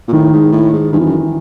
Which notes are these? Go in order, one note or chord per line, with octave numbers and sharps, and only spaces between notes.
A#2
A2 D#3
G#2
A2
G#2
G2 E3
F2
F#2